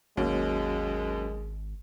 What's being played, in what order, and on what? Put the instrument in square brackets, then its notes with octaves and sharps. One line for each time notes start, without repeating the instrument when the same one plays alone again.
[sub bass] G#1 [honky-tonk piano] D#2 [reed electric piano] F#3 C#4 F#4 [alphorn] G#3